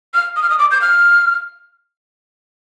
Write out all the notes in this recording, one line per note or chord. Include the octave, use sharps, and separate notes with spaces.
F6
D#6
F6
D#6
D6
G6
F6